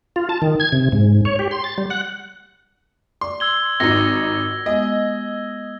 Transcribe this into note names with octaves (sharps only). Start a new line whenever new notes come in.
F4
A5
D#3
G#6
C3
G#2
C#5
G4
C6
A6
G3
F#5
D5 C6
E6 G#6 G7
G#1 D#4 F4 F#4 A#6
G#3 B3 D#5